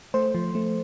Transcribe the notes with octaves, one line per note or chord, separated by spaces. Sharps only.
A3 C5
F3
A3